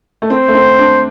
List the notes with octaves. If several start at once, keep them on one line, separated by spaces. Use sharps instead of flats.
A3
C4 C5
A3
C4
D4